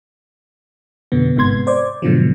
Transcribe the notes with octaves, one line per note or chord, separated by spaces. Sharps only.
F2 B2 D3 B3
G1 G#2 C3 B3 C6 G#6
C5 D5
G#2 B2 D3 F3 F#3